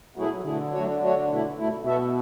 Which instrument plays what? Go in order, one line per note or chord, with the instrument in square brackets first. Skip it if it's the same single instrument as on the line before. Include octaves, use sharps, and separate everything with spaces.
[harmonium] B2 A3 E4 G#4 [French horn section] F#3
[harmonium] B2 A3 E4 G#4 [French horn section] D3
[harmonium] F#3 A3 D4 F#4 C#5
F#3 A3 D4 F#4 C#5
B2 A3 E4
B2 A3 E4
[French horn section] B2 [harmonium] B3 F#4 A4 E5